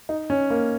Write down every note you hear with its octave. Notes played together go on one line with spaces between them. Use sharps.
D#4
C#4
A#3